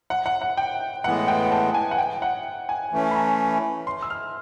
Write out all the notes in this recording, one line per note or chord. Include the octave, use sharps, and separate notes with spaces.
F#5
F#5
F#5
G5
A2 E3 G#3 B3 F#5
G5
A5
G#5
F#5
G5
F#5
G#5
E3 A3 C#4
B5
A#5
C6
E6
F6